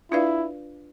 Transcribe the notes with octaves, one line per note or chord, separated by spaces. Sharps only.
D4 E4 F4 B4 D5 F5